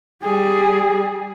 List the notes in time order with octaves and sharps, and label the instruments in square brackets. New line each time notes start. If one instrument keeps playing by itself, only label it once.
[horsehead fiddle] G3 G#4